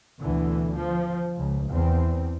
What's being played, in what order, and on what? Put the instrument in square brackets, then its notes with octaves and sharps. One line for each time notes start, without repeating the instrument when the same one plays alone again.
[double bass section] D2 B2 D3 E3
F3
C#2
E2 C4